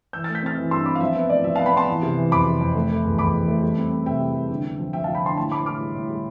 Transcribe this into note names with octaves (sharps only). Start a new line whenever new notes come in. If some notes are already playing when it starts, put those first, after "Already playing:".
E3 E6 G6
A3 F6 A6
G6 B6
C4 F6 A6
E3
G2 C6 E6
C4 B5 D6
F5
F3 E5
B3 E5
A2 D5
F3 E5
B3 F5 A5
G5 B5
B3 A5 C6
E3
C3
E3
F2 B5 D6
C3
F2
A3
A3
E2
E2 B5 D6
E2
A3
G3
C4
C4
C3 E5 G5
G3
G3
D3
D3
F3
F3 E5 G5
F3 F5 A5
G5 B5
D3 A5 C6
A2 A5 C6
A2 B5 D6
A2 D6 F6
G3
A2
G3